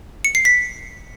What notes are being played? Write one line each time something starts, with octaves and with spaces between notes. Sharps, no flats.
C#7
C7
B6